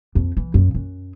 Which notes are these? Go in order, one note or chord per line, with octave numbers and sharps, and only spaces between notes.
F2
E3
F#2
F#2